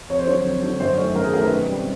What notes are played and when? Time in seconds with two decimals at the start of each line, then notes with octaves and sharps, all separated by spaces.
0.10 F2 C#5
0.19 C5
0.27 D3 F#3 C#5
0.45 F2
0.62 D3 F#3
0.80 F#2 C5
0.98 D#3 F#3 A3 C#4
1.16 F#2 A#4
1.24 G#4
1.33 D#3 F#3 A3 C#4 A#4
1.42 B4
1.51 B2
1.68 G3 C4